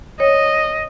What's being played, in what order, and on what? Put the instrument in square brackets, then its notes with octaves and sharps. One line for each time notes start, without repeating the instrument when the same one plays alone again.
[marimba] C#5 [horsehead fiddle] D#5